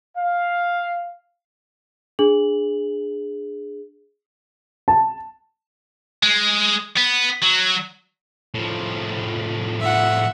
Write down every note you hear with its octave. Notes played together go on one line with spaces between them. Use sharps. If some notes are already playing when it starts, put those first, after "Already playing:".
F5
D4 G#4 F#7
A5
G#3
B3
F#3
A2 F3
E5 F#5